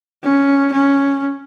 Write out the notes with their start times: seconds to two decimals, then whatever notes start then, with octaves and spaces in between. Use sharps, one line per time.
0.24 C#4
0.73 C#4